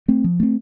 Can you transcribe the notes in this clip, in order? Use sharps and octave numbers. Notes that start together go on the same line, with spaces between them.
A3 C4
F3
A3 C4